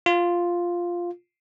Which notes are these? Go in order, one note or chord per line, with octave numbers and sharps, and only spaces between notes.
F4